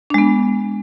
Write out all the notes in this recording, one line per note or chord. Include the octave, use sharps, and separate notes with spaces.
G#3 B3 D4